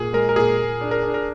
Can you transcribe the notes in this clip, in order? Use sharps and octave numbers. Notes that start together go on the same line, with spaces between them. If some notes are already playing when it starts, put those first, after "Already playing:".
Already playing: A#2 G#4
G#3 A#4
A#4
A#2 G#4
A#2
D4
A#4
D4
A#4